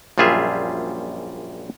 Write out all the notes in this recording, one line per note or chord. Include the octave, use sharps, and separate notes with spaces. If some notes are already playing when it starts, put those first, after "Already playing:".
A#1 F#2 G3 F4 G#4 E5